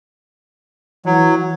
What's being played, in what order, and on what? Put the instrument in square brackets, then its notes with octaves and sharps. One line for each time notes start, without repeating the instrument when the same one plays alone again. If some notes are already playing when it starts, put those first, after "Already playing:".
[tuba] E3 [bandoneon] F#3